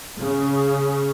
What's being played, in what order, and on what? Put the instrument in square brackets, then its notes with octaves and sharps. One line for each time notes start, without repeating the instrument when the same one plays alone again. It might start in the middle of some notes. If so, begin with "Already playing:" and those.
[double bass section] C#3